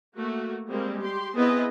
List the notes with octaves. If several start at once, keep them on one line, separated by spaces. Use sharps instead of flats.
A3 A#3 F#4
G3 G#3 A#3 C4
G4 C6
B3 C4 E4 G#4 B4 D#5